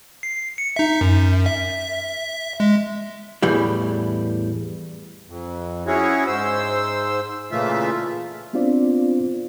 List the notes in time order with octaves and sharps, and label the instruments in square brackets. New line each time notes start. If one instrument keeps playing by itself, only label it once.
[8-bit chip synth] C7
C#7
D#4 E5
F#2
E5
G#3
[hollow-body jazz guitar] E2 A2 E3 G3
[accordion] F2
C#4 E4 F#4 G#4 C#5
G#2 C5 E6
A#2 C#3 E3 A3 F4 E5
[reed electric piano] B3 C4 D4 F4 C5 D5